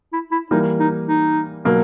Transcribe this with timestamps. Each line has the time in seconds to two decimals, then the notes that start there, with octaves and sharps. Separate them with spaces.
0.13 E4
0.32 E4
0.51 E3 G3 A#3 D#4
0.80 D#4
1.08 D#4
1.65 B2 F#3 A#3